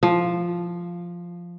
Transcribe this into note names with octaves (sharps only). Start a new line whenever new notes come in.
F3